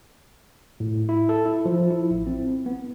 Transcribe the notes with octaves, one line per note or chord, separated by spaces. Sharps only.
A2
E4
A4
E4
F3
E4
A1
C4
B3